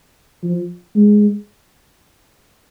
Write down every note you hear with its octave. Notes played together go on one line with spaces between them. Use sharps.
F3
G#3